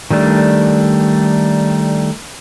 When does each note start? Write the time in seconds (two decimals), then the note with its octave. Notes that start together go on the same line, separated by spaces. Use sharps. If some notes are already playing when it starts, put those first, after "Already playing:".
0.10 D#3 G3 A3 D4